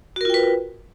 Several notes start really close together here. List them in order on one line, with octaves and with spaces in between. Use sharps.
F#4 A#4 F4 G5 B4